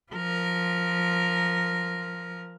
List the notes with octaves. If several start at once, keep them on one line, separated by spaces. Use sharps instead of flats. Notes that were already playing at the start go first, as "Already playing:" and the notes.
F3 A#4